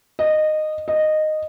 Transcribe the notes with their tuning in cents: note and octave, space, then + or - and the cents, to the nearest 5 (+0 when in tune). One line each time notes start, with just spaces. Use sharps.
D#5 -15
D#5 -10